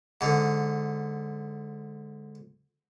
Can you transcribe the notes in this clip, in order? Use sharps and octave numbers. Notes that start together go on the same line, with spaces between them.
G#2 D3